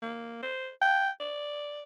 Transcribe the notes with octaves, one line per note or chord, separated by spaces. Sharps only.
A#3
C5
G5
D5